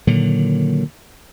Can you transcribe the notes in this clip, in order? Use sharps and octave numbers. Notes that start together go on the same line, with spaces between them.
A#2 D3 D#3 F#3